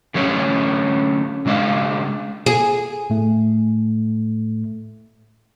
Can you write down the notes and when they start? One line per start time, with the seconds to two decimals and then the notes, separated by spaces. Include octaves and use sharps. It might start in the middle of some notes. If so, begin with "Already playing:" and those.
0.14 D3 F#3 A3 C#4
1.46 C#3 G#3 D4 F5
2.46 G#4
3.10 A2 A3